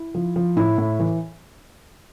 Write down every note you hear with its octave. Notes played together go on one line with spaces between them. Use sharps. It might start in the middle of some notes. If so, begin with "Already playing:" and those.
Already playing: E4
F3
F3
A2 E4
A2
E3